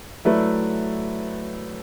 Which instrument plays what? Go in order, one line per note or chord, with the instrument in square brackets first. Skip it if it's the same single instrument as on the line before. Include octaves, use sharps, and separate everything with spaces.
[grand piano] F#3 A3 E4 B4 D5